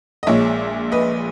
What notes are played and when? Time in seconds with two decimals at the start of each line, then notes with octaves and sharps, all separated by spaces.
0.23 D#5
0.27 A#1 A#2 G#3 C#5 E5
0.92 B4 D#5